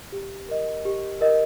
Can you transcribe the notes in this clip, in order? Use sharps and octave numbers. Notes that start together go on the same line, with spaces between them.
G4
A#4 D#5
G4
A#4 D#5